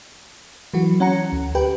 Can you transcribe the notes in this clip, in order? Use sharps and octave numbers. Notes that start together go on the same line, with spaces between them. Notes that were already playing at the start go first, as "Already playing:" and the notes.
E3 F#3 F#4
C#4 F#5 A#5 C#7
D2
G4 B4 G5